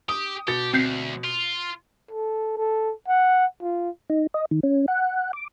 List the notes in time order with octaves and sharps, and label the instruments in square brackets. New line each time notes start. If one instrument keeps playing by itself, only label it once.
[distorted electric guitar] G4 [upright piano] D#6
[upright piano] B2 A6 C#7 [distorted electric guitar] G4
[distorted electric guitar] D2 [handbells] C4 G6 C7
[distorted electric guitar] F4
[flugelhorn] A4
A4
F#5
F4
[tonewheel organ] D#4
D#5
D#3
C#4
F#5
D6